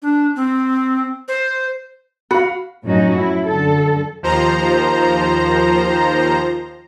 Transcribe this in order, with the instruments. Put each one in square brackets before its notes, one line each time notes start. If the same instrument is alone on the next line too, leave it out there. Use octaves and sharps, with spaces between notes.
[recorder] D4
C4
C5
[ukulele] F#4 [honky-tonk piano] F5 B5
[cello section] F#2 A2 F3 C#4 D#4 F#4
E4
F#2 D3 A4
[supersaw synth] D#2 F3 C5 A#5